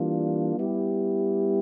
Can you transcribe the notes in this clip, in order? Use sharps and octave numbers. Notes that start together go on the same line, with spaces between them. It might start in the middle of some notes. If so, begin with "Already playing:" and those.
Already playing: E3 G3 A#3 D4 F4
G3 B3 E4 G4